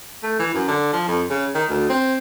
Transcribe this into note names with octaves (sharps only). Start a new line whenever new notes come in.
A3
E3
F#2
D3
F3
F2
C#3
D#3
D2
C4